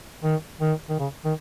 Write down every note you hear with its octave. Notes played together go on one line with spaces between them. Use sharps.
D#3
D#3
D#3
C#3
D#3